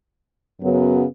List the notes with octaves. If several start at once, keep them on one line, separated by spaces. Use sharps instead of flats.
F#2 C#3 F#3 B3